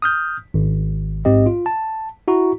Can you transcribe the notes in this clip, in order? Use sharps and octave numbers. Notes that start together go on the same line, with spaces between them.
D#6 F6 G6
G#1
A1 G#2 C4 G4 D#5
F4
A5
E4 F#4 A#5 C#6